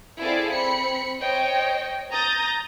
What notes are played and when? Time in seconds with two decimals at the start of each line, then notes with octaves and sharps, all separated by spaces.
0.21 C4 E4 G#4 A4 D5 F5
0.50 C4 B5 C#7
1.20 C5 C#5 D#5 G5
2.11 A#5 D#6 G6 A6 A#6